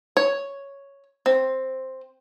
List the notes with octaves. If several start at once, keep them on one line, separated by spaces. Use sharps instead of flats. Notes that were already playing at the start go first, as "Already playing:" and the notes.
C#5
C4